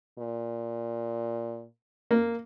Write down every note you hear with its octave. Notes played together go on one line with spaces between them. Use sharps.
A#2
A#3